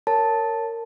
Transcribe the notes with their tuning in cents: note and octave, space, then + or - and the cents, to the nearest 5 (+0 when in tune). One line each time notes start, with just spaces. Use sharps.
A#4 -20 C#5 +0 A5 +0